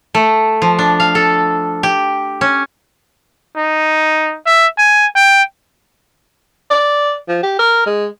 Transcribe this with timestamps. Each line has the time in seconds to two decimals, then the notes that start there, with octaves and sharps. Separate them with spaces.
0.15 A3
0.62 F3
0.79 D4
1.00 F5
1.15 A4
1.83 G4
2.41 C#4
3.56 D#4
4.46 E5
4.78 G#5
5.16 G5
6.71 D5
7.28 F3
7.43 G4
7.59 A#4
7.86 G#3